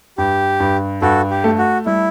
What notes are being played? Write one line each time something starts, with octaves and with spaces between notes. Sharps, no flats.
G2 G4
G2
G2 F#4 A4
G4
A3
F#4
G3 E4